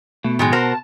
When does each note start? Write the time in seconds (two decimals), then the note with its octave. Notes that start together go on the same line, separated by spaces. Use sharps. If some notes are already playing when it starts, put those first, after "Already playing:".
0.24 B2 A3
0.39 A2 D#3 F#3 G#3
0.52 F#4 A#4 C5 A5